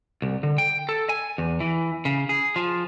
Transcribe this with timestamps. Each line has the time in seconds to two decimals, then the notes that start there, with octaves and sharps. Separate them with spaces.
0.22 C2
0.43 D3
0.58 G5
0.89 A4
1.09 G#5
1.38 E2
1.60 E3
2.05 C#3
2.29 G#4
2.56 F3